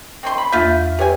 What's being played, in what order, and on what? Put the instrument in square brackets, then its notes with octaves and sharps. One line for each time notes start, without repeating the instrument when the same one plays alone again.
[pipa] C4 C#5 C6
B5
[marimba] E2 A#3 G6 [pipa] F4 E5
[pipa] C3 G#5 [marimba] G4 B4 C#5